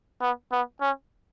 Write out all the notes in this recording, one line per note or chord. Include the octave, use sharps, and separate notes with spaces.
B3
B3
C#4